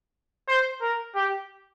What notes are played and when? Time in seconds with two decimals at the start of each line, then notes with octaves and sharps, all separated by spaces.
0.48 C5
0.81 A#4
1.15 G4